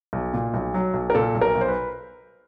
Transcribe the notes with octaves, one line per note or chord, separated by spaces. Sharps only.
B1
A#2
B1
F#3
B1
A#4
A#2 A4
B1
A#4
B1
C5
B4